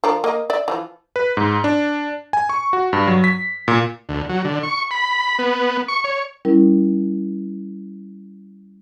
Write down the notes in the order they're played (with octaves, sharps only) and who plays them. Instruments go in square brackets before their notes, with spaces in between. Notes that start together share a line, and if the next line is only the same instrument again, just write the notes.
[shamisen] F3 D4 A#4
A#3 D#5
D5 E5
E3 F3
[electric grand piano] B4
G#2
D4
G#5
C#6
F#4
G2
F#3
B6
A#2
[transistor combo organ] D2
F#3
D3
C#6
B5
B3
C#6
C#5
[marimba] G3 C#4 E4 A#4